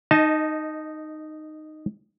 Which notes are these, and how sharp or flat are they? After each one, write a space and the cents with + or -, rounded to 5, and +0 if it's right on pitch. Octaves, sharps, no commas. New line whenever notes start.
D#4 -10 D#5 +15 A5 -5